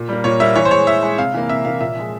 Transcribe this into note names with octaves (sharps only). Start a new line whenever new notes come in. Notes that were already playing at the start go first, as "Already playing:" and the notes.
Already playing: A#2
G3 A#3
A#2 C#5
G3 A#3 E5
E3 C#5
C5
G#3 C#5
E3 E5
G#3
C3 F5
E3 A#3
C3 E5
E3 A#3 F5
A#2 E5
F3 G#3